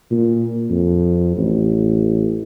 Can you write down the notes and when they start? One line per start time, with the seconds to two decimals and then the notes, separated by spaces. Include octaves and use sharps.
0.11 A#2
0.70 F2
1.37 A1